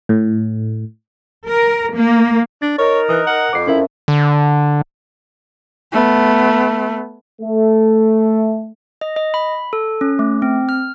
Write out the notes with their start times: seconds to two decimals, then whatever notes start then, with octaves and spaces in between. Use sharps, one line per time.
0.09 A2
1.49 A#4
1.95 A#3
2.62 D4 A6
2.78 D#4 A#4 C#5
3.09 E3 D#6 F#6
3.27 F#5
3.53 F2 D6 C7
3.67 C#4 E4 A#4 E5
4.08 D3
5.93 A3 B3
7.42 A3
9.01 D#5
9.16 D#5
9.34 B5
9.73 A4
10.01 C#4
10.19 A3
10.42 C4
10.69 F6